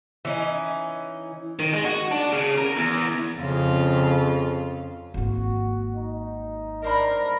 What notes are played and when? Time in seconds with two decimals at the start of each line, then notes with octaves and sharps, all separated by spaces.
0.25 E3 C#4 D#4
1.59 D#3
1.73 G#3
1.85 F#4
2.11 D4
2.32 C#3
2.58 A#4
2.77 E2
3.39 F2 C#3 F4
5.14 G#1 A#3 F#4
5.95 D#4
6.84 D4 A#4 C5 B5 F6